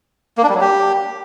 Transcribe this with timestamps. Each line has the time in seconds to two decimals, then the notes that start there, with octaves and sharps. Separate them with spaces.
0.38 A#3
0.43 D4
0.49 G3
0.55 F#3
0.61 G4